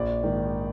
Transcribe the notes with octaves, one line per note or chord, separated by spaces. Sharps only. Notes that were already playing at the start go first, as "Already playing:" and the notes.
Already playing: A#1 D5
G#2 D#3